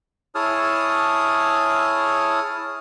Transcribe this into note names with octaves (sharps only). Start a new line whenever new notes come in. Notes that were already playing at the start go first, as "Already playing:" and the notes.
E4 G#4 C#5 A5 D#6 F6